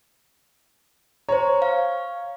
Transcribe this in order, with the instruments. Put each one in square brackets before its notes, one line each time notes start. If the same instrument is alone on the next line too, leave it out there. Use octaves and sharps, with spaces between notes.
[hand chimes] C5 A#5 [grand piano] C#5
[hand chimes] F5